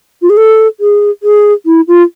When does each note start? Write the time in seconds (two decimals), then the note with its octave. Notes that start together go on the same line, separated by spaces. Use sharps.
0.22 F4
0.30 G#4
0.37 A4
0.80 G#4
1.23 G#4
1.66 E4
1.88 F4